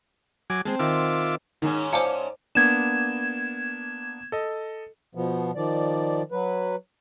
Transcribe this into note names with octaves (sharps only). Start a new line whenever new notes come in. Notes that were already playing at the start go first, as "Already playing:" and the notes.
F#3 G#5 D6
G#3 C4 A5
D#3 F4 E5 D6
G#2 D#3 C#4
C5 D5 F5 G#5 A5 D6 C#7
A#3 B3 D4 G#6 E7
A4 D#5
B2 F3 B3
D#3 F3 D5
F#3 B4